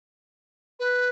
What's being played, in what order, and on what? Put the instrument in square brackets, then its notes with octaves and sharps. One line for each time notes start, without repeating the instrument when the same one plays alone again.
[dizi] B4